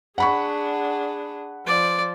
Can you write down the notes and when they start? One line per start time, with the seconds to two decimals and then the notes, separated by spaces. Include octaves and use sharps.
0.18 D4 G#4 F#5 B5 C#6
1.66 F3 D5